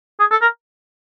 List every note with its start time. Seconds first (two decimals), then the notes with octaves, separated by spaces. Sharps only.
0.19 G#4
0.31 A4
0.42 A#4